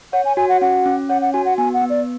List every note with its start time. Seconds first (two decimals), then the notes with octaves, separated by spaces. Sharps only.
0.13 C#5 F#5
0.25 G#5
0.37 F#4 G#5
0.49 F#5
0.61 C#4 F#5
0.86 C#4
1.09 C#5 F#5
1.22 F#5
1.33 F#4 G#5
1.45 F#5
1.58 B3 G#5
1.73 F#5
1.81 B3
1.90 D5